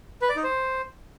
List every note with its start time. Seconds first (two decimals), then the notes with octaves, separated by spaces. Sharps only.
0.22 B4
0.29 D5
0.36 D#4
0.44 C5